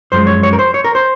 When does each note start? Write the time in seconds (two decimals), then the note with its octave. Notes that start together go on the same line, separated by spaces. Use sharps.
0.12 F#2 F3 G#3 C5
0.27 C#5
0.43 C#5
0.53 A#4
0.59 C5
0.74 C#5
0.84 A#4
0.95 C5